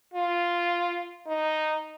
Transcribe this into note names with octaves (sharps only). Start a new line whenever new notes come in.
F4
D#4